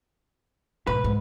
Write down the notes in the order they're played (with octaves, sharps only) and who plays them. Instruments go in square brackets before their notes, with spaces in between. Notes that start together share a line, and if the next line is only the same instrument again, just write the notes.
[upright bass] G#2 B2 [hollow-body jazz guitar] B4
[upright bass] G#2